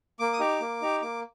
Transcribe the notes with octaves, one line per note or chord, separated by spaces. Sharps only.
A#3 D6
D#6
D#4 G4 D6
A#3
D#4 G4
A#3 D6